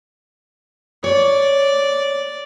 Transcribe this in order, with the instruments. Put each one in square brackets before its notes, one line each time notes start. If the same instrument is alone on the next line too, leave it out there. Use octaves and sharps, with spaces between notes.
[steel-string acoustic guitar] C#5 [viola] D5